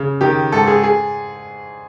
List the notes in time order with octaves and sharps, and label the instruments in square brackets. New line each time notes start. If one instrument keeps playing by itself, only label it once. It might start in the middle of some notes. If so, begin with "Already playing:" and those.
Already playing: [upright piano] C#3
D#3 G4
G#2 A4
G#4
G#4